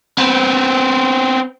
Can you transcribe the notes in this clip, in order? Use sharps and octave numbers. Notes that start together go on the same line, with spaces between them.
B3 C4